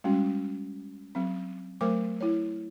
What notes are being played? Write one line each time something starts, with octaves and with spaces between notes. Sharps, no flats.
G3 G#3 C#4 F#4
F#3 C4
F#3 A3 A#4 C5 D6
E4 C#5